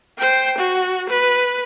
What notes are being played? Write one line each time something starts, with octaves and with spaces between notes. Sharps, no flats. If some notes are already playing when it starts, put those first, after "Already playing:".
C5 G5
F#4
B4